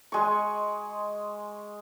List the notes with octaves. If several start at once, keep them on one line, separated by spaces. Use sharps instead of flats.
G#3 G#5 C#6